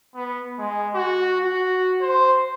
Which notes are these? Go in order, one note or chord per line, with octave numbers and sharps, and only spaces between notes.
B3
G#3
F#4
F#4
C5